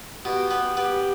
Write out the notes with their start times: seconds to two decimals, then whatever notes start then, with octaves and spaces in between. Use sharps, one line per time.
0.25 B2 G4
0.51 B3
0.77 B3 G4